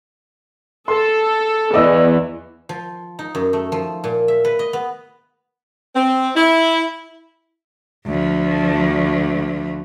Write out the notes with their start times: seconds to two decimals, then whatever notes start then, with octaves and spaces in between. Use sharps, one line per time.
0.88 A4 C6
1.74 E2 E3 D5 D#5 E6
2.69 F3
3.19 D#4
3.35 F#2
3.53 A3
3.72 F3
4.04 A#2
4.28 E5
4.45 B4
4.59 D#5
4.73 B3
5.95 C4
6.36 E4
8.06 D2 F3